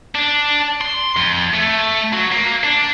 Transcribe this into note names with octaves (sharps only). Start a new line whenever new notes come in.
D4
C6
F2
A3
F#3
A#3
D4